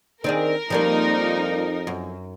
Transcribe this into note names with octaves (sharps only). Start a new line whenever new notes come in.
D#3 C4 D4 G#4 A#4
F2 F3 G3 A#3 D#4
F#2